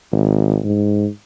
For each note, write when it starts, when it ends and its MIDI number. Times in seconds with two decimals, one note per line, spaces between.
0.12 0.59 32
0.65 1.08 44